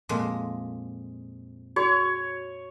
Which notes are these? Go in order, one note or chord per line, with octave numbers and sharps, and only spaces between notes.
F2 A#2 G#3
F#4 C#5